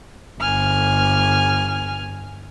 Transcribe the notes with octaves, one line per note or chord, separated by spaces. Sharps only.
G1 G#5 F6